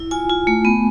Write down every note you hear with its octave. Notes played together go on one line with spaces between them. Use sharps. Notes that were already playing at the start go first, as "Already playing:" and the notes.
Already playing: E4
F4 G#5
F4
A3
B3